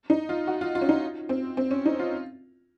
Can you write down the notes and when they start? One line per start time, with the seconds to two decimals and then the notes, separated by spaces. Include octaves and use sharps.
0.10 D#4
0.29 F4
0.47 F#4
0.61 F4
0.75 F4
0.81 C#4
0.89 D#4
1.29 C4
1.57 C4
1.71 C#4
1.86 D#4
1.99 F4